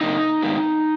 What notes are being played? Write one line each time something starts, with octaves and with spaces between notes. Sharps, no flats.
F#2 C#3 A#3 D#4
G#2 D#3 G#3 B3